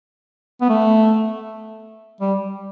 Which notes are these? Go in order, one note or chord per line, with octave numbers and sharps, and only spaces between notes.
B3
A3
G3